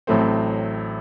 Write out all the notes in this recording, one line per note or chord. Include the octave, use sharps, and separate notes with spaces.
A1 A2 F#3 A3 C4